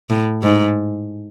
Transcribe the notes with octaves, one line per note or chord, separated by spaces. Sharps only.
A2
G#2